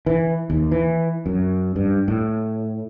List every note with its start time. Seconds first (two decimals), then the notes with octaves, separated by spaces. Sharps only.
0.06 E3
0.50 D#2
0.71 E3
1.26 F#2
1.76 G2
2.08 A2